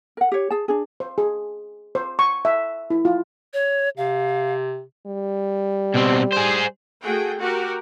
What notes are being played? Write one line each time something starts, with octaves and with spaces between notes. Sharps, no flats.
A#4 F#5
G4 C#5
G#4 A5
D4 G#4
C5
G#4
C5
C#6
E5
E4
F4
C#5
C3 F5
G3
B2 C4
G#4 C5
A3 F#4 G#4 G5
F#4 G4 A#4